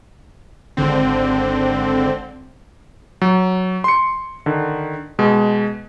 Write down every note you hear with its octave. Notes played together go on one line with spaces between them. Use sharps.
G#1 D3 C4
F#3
C6 C#7
D3 D#3
B2 G#3